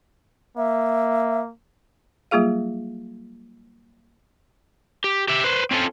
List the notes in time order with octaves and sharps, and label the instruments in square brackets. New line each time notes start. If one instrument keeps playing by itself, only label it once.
[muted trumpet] A#3 [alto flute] E5
[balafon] F#3 G3 A#3 F4 G#4 F5
[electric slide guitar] G4
G4 E5
B4 C5
C4 C#4 F4 A4